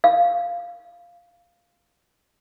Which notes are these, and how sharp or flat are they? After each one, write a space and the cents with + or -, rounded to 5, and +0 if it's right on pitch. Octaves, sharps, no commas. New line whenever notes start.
F5 -5